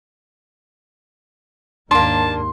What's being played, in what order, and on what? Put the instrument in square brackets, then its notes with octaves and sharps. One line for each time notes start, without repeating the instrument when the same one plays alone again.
[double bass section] D#2 G#2 [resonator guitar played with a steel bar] A#3 D4 [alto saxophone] A5 [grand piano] C6